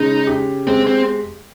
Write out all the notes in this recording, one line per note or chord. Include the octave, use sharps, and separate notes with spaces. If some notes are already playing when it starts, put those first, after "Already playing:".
Already playing: C#3 G#3 D#4
G4
G#3 C4
C4